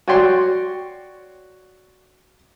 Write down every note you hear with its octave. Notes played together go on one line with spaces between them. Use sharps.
F#4 C#5 D5 G5 C6